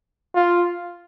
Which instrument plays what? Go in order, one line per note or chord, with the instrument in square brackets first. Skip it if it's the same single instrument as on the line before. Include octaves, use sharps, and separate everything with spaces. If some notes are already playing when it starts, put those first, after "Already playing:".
[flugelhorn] F4